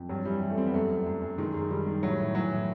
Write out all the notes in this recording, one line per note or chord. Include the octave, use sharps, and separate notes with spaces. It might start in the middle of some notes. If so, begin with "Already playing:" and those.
Already playing: F2
G2 F#3
E3 G3
E3
A3
G2 C4
B3
F#2 A3
F#2
F#2
F#2
D#3 G#3
F#2
D#3 G3
D#3
A2 F#3
A2
E3 F#3
A2